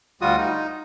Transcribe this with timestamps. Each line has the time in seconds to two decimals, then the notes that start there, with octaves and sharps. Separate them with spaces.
0.21 D2 G3 F4 F#4 D#6
0.38 D#4